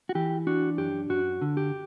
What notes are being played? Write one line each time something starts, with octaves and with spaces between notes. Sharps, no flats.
F#4
E3 G4
D4 F#4
F#2 G4
F#2 F#4
D3
G4